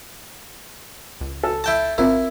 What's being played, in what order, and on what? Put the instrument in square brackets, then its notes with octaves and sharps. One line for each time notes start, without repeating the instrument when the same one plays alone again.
[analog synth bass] C#2
[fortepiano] A4
[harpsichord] E4 G5 A5
[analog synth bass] G#1 [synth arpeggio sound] C4 F4 A#4 [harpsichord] E4